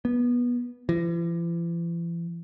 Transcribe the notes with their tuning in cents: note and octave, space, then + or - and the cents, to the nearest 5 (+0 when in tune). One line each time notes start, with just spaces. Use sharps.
B3 -20
E3 +45